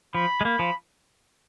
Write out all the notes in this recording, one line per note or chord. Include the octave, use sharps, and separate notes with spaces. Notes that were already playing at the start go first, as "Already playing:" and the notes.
F3 B5
G#3
A#3 B5
F3